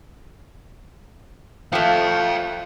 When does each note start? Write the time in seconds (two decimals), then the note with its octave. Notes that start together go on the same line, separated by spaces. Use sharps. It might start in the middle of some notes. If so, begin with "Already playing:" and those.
1.72 F3 A3 F5 G5